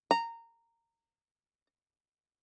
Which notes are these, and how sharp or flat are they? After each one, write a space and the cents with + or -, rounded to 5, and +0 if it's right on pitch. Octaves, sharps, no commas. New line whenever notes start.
A#5 -15